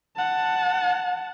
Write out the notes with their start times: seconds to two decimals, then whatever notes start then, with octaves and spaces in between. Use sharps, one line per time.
0.17 F#5 A5